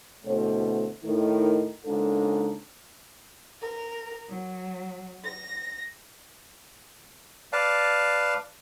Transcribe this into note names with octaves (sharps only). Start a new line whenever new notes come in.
D2 B2 E3 A3 C4 C5
A2 D#3
G#2 C#3 A#3 D4 F4 A4
A#4
F#3
A#6
B4 D5 F5 A5